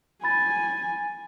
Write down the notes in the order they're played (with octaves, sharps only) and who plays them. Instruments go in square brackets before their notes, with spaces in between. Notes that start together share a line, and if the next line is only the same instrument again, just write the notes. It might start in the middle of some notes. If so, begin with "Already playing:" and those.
[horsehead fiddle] G#5 [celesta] B5 A6